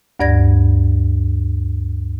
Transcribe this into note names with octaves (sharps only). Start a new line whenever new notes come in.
D2 G2 D5 G#6 A#6